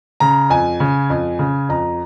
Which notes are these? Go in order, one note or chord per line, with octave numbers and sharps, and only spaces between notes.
C#3 A#5
F2 G#5
C#3
F2
C#3
F2 A#5